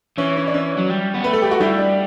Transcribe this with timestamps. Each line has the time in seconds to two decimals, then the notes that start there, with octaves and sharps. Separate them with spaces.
0.18 E3 C#4
0.37 C#4
0.48 D4
0.54 C#4
0.78 F#3
0.90 G3
1.14 B3
1.24 A3 B4
1.33 A4
1.42 G4
1.51 F#4
1.60 G3 E4
1.78 D4